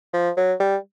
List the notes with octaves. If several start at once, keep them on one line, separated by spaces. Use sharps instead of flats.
F3
F#3
G3